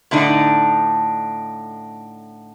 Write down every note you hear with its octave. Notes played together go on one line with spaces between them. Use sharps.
A2 D3 D4 D#4